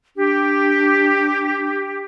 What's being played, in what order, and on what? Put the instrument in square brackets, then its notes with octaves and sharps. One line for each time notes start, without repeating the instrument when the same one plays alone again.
[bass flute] D4 [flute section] G4